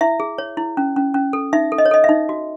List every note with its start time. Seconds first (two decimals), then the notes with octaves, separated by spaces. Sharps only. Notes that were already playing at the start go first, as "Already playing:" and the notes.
0.01 E4 E5
0.20 G#4
0.38 C#5
0.57 E4
0.77 C#4
0.96 C#4
1.14 C#4
1.33 A4
1.53 D#4 E5
1.72 A4
1.78 D#5
1.85 C#5
1.91 A4 D#5
2.04 E5
2.09 D#4
2.29 F#4